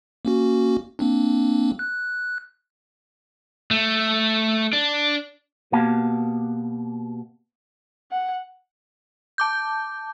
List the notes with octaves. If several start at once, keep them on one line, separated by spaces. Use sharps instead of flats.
A#3 C#4 F#4
A#3 C4 D4
F#6
A3
D4
B2 A#3 B3 G4 F5 A5
F#5
A5 D6 G6